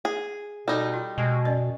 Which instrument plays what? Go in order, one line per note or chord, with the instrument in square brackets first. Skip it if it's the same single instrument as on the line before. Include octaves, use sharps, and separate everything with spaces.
[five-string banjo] G#4
[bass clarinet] B2 [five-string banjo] G3 D#4 [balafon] A4 C#5
[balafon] F4
[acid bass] B2 [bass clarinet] G#3
[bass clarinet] F#2 [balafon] C#4 D5 D#5